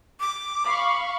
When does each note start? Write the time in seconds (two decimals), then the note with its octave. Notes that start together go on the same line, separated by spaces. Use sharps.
0.20 D6
0.64 F5 B5 C#6